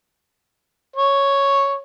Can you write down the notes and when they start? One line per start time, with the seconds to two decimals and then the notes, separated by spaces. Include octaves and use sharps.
0.96 C#5